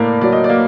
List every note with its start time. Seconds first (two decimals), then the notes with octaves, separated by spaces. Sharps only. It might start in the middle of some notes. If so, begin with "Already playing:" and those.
Already playing: A2 A#3 A#4 D5
0.21 F#3 D5
0.32 D#5
0.44 D5
0.49 A#3